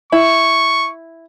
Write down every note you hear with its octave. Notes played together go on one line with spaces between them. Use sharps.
E4 C#6